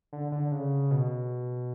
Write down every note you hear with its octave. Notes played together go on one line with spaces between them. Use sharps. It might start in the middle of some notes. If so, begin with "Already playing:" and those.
D3
D3
C#3
B2